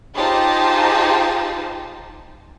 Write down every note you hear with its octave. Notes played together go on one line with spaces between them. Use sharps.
D#4 F4 G4 G#4 C5 A5